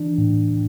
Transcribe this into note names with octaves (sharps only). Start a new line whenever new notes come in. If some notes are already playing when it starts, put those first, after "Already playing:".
Already playing: E3 D4
A2
A2